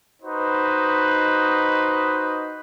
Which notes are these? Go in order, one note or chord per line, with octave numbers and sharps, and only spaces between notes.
D#4 F#4 B4 C5 D#5